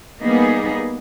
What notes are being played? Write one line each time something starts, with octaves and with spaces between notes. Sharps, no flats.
G3 A#3 B3 D#4 G#4